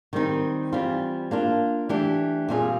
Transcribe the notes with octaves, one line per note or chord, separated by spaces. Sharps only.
D#3 G3 C4 D#4
E3 G3 C4 F4
A#3 D4 F4
E3 A3 D4 G4
A#2 G3 C4 F4 G#4